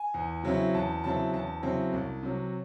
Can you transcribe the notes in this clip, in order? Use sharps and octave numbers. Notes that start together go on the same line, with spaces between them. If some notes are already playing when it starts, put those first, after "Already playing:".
Already playing: G#5
E2
C#3 F#3 C4 E4
E2 A5
C#3 F#3 C4 E4 A5
E2 A5
C#3 F#3 C4 E4
C2
C3 F#3